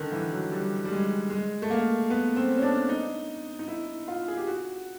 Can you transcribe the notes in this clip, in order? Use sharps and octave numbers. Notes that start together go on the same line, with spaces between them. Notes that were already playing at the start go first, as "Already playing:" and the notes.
Already playing: D3 D#3
E3
F#3
G3
G3
G#3
G#3
A3
A#3
B3
C4
C#4
D4
D#4
D#4
E4
F4
G#4
G4
F#4